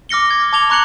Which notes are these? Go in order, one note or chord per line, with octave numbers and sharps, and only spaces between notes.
D6 F6 A#6 C#7 G7
G#6
A5 D6 G#6 F7 G7
A#5 C#6 F#6 G#6 C#7 F#7